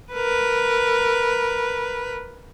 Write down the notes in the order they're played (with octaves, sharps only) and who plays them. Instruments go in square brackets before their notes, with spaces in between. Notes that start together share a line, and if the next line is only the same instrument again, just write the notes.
[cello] A#4 B4